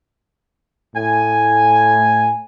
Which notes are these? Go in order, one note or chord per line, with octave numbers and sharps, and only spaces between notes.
A2 G#5